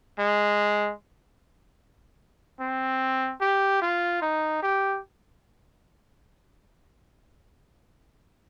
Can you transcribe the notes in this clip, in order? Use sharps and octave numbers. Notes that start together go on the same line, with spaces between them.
G#3
C4
G4
F4
D#4
G4